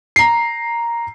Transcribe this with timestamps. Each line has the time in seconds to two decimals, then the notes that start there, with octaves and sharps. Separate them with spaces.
0.16 A#5 C7